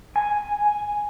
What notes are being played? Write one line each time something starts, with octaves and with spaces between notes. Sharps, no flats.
G#5